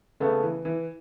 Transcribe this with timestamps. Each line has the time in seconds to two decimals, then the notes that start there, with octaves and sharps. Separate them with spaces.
0.20 C#3 A3 B3
0.43 E3
0.65 E3